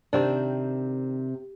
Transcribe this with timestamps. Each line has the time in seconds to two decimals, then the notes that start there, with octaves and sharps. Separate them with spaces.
0.13 C3 D#3 C4 D4